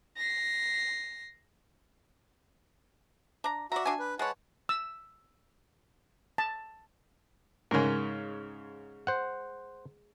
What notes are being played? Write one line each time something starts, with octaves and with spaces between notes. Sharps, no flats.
A#6 C7
D4 A#5
F#4 D5 E5 A#5
D4 G#5
B4
G#3 B4 C#5 F#5 A5
E6
A5
G#2 C#3 G#3 A#4
C5 F#5